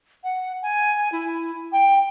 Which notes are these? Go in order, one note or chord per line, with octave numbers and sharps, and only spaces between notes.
F#5
G#5
E4
G5